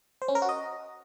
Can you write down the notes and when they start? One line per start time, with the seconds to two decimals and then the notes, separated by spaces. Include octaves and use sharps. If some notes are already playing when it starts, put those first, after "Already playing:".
0.22 C5
0.28 C#4
0.35 A#4
0.42 F#4
0.49 D#5